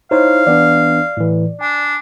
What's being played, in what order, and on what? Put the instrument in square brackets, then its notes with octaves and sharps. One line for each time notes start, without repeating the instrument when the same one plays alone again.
[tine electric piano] D#4 E4 C#5 [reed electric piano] C5 [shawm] F5
[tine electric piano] E3 B3 D4 [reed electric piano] D5
[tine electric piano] A2 E3
[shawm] D4 [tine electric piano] G#5